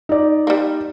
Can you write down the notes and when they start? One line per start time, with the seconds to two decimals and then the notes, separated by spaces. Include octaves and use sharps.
0.09 D#4 D5
0.47 G3 A#3